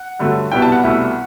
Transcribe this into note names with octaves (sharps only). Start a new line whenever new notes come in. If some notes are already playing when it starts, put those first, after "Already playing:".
Already playing: F#5
G2 D3 F#3 A3
C2 B2 G3 B3 E4 G5
A5
F#5
C2 B2 A3 E4